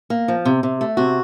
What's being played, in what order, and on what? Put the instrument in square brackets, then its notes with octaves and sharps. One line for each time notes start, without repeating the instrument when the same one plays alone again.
[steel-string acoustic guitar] A#3
F3
C3
C3
A3
C3 F#4